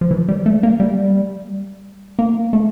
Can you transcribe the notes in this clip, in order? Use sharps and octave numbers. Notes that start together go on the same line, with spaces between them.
F3
E3
G3
A3
A#3
G3
A#3
A3